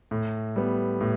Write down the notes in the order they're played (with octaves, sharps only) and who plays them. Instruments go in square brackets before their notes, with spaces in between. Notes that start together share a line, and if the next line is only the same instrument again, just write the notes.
[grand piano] A2
G3 B3
A2